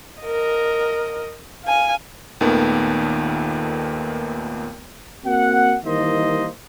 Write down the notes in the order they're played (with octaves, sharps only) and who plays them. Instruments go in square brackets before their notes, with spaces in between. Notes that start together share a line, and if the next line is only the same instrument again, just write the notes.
[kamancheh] A#4 D#5
F5 G#5
[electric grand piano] D#2 A#2 D#3 A3 B3
[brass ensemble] A#3 C4 F#4 F#5
D#3 E3 G3 A#3 C5 D#5